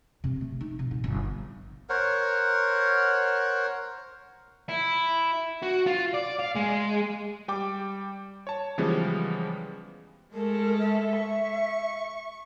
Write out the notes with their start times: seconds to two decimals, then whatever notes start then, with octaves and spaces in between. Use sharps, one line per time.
0.24 C3
0.41 A3
0.61 D#4
0.79 C3
0.91 G#2
1.04 G1
1.89 A#4 C5 C#5 F#5
4.69 E4
5.62 F#4
5.86 F4
6.14 D5
6.39 F5
6.55 G#3
7.48 G3 G5 D6
8.47 C#5 A5
8.78 C#3 E3 F3 G3 G#3 B3
10.34 G#3 A3 A4 A#4
10.78 E5
11.20 C#6